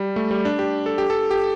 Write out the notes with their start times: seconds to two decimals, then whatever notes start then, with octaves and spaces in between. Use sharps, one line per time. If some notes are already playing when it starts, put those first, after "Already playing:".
Already playing: G3
0.16 A3
0.31 G3
0.45 D4
0.59 G4
0.86 A4
0.98 G4
1.10 A4
1.31 G4